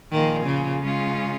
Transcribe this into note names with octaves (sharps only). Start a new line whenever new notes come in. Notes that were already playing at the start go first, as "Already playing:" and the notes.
A#2 D#3 F3 A#3 F4 G#4
C#3
C#3 G#3 C#4 F4